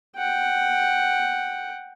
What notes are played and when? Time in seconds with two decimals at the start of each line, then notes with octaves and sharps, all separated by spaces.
0.17 F#5 G5